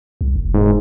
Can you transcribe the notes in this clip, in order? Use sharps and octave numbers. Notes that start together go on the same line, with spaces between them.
C2
F1
G#2